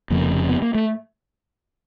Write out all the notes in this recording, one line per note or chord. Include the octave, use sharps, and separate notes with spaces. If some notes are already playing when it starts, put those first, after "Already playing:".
F1 F2 C#3 A#3
B3
A#3
A3